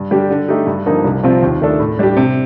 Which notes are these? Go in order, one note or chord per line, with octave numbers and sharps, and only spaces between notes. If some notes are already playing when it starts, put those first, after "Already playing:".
Already playing: G2
D3 G3 D4 G4
D3
A3 D#4 G4
G2
D3 F3 A#3 D#4
C2
C3 F3 C4 F4
D#2
D#3 A3 D4 A4
A2
G3 D4 G4
C3